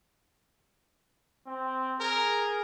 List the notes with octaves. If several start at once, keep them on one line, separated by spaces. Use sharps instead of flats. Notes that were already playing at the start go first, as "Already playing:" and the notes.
C4
G#4 A#4